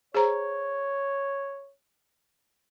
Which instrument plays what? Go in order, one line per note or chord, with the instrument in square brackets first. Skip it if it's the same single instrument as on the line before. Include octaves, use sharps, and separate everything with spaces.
[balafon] G#4 C5 A#5 [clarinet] C#5